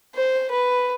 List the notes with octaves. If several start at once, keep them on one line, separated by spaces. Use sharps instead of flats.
C5
B4